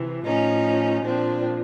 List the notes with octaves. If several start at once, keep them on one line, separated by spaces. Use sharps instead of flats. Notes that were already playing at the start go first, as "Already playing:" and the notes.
Already playing: C3 E3
A2 F3 C#4 D#4
A#2 F3 C4 D4